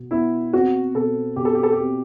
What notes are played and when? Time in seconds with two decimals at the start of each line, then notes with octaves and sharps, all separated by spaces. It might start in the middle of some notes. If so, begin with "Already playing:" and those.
Already playing: B2 B3
0.11 B3 E4
0.53 C4 F#4
0.94 B2 A4
1.36 B2 G4
1.45 A4
1.55 G4
1.63 A4
1.72 G4
1.78 C4